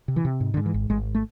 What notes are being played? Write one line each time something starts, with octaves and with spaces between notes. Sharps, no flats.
C3
E3
C3
G#2
D3
G#2
E3
G#1
G#1 G#3
A3